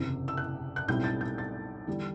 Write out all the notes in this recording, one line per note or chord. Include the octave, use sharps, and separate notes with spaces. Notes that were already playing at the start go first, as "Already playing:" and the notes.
Already playing: F#1 E2 C3 E6
E6
F#6
F#6
B1 A2 G3 C4 E4 G6
A6
G6
A6
E2 D3 G3 D4